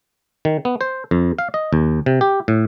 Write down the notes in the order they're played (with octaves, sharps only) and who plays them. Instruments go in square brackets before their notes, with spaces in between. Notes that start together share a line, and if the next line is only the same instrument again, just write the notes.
[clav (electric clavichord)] D#3
B3
C5
F2
F5
D#5
D#2
C3
G4
A2